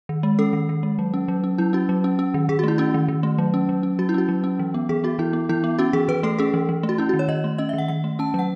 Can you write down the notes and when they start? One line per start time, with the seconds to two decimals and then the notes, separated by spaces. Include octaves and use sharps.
0.09 D#3
0.23 G#3
0.39 C#4 A4
0.53 D#3
0.69 D#3
0.83 G#3
0.99 F#3
1.14 C#4
1.28 F#3
1.44 C#4
1.58 F#3 E4
1.73 C#4 F#4
1.89 F#3
2.04 C#4
2.19 C#4
2.34 D#3
2.49 D#3 G#4
2.59 F#4
2.64 A3 E4
2.78 C#4 F#4
2.94 D#3
3.08 D#3
3.23 A3
3.38 F#3
3.54 C#4
3.69 F#3
3.83 C#4
3.99 F#3 F#4
4.09 E4
4.14 C#4 F#4
4.29 F#3
4.44 C#4
4.59 E3
4.74 B3
4.89 E3 G#4
5.04 B3 F#4
5.19 E3 E4
5.33 B3
5.49 E3 E4
5.64 B3
5.79 C#4 F#4
5.93 E3 G#4
6.08 E3 B4
6.23 A3 A4
6.39 C#4 G#4
6.54 E3
6.69 E3
6.83 A3
6.89 F#4
6.98 C#4 E4
7.09 F#4
7.13 D#3
7.19 C#5
7.28 D#3 D#5
7.44 A3
7.58 C#4 D#5
7.69 E5
7.74 D#3 F#5
7.88 D#3 F#5
8.04 A3
8.19 C#4 A5
8.34 F#3 F#5